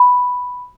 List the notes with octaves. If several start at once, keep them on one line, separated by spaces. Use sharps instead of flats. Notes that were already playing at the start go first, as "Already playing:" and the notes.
Already playing: B5